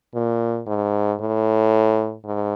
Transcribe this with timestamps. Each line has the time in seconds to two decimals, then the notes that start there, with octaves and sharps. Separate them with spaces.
0.14 A#2
0.67 G#2
1.20 A2
2.25 G#2